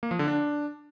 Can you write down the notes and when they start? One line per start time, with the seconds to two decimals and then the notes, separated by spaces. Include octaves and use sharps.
0.03 A#3
0.11 F3
0.19 D3
0.27 D4